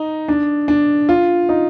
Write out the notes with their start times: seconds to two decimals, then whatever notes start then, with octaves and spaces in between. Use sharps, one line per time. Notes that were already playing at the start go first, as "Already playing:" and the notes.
Already playing: D#4
0.28 D4
0.68 D4
1.09 F4
1.49 D#4